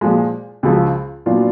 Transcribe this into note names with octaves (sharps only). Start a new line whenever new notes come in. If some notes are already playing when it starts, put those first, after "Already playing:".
A#2 F3 G#3
C#2 C#3 F3
A#2 F#3 B3 D4 F4